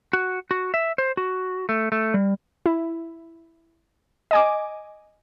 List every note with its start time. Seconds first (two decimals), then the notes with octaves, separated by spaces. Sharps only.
0.13 F#4
0.51 F#4
0.74 E5
0.98 C5
1.17 F#4
1.69 A3
1.92 A3
2.14 G3
2.66 E4
4.31 D#5 G#5 D6